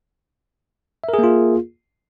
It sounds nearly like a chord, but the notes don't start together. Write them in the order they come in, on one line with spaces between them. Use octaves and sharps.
E5 A#4 G#4 A#3 F4